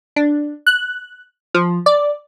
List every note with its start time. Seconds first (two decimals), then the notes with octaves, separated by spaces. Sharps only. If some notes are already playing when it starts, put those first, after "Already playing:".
0.16 D4
0.67 F#6
1.54 F3
1.86 D5